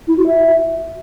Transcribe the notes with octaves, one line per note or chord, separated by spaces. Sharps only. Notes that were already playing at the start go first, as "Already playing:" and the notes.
E4
F#4
E5